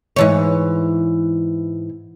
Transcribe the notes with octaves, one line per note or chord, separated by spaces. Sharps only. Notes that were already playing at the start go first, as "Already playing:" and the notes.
G#2 E3 C#5